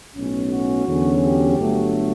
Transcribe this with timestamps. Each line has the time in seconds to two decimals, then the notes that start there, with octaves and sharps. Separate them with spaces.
0.15 B1 A2 F#3 C#4
0.50 F#4
0.86 E2 D3 F#3 C#4
1.22 G4
1.57 G1 G2 F#3 A3